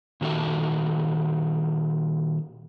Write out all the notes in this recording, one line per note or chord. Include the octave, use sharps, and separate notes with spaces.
A#2 D#3 F#4 G4 A4 E5